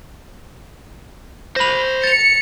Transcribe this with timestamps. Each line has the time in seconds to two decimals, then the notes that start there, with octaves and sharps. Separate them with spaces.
1.56 C5 B5 A#6 F7
2.04 A6 C#7 F7